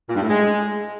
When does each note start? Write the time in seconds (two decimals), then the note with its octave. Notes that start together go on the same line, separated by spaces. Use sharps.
0.08 A#2
0.15 G2
0.22 A2
0.29 G#3